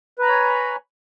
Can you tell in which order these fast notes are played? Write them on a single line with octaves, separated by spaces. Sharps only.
B4 A#5 B5 C#5 G#5